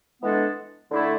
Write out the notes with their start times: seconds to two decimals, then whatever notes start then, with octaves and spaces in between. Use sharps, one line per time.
0.20 E3 G#3 B3 D4 A4
0.90 D3 A3 E4 A4